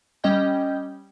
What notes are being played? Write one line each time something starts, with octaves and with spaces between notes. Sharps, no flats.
G3 C#4 D#5 G5 G6